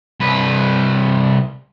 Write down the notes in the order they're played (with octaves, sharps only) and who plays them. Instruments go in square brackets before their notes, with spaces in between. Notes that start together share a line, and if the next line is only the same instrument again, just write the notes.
[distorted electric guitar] C2 B4